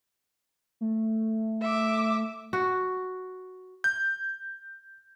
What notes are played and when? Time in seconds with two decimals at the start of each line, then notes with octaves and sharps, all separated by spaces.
0.81 A3
1.62 E5 D6
2.53 F#4
3.84 G6